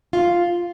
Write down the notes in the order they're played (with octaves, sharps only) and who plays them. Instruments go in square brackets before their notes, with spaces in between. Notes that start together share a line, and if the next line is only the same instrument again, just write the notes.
[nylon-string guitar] F4